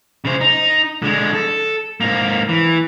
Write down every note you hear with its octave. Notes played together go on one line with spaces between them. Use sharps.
C#3 C5
D#4
D3 G#3
A4
G#2 A#3
E3